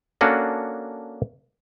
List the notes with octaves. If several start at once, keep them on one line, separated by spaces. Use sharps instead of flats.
A#3 C#4 D4 F#4 A4